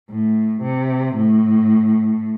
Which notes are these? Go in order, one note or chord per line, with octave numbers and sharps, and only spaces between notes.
A2
C3
A2